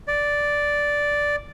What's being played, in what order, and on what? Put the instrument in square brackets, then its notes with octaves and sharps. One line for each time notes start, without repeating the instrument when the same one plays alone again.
[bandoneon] D5